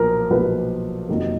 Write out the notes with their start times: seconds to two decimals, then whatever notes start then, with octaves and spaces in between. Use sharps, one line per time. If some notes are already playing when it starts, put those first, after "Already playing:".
Already playing: B1 A#2 F3 A#4 A#5
0.30 B1 A#2 F3 B4
1.09 F1 F2 D#3 F#3 A#3